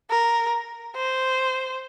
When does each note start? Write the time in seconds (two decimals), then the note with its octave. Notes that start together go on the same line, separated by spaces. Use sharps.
0.10 A#4
0.96 C5